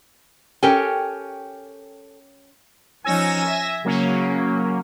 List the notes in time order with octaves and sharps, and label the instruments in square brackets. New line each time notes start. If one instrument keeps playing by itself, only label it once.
[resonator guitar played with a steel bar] C#4 G4 A#4 [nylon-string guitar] A4 G5 G#5
[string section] F3 C#4 D#4 [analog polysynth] G#5 E6 A#6
[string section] E5
[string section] C#3 [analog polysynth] F#3 A#3 C#4